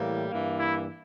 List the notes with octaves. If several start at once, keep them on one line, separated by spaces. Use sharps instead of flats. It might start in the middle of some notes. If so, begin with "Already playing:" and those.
Already playing: A2 E3 G3 A#3
G2 E3 A#3
E4